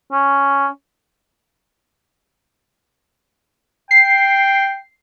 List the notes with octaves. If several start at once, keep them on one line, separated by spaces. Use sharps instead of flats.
C#4
G5 C7